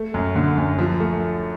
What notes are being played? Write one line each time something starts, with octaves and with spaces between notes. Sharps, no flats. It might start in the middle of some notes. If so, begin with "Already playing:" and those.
Already playing: A3
F#2
D3
F#2
F3
A3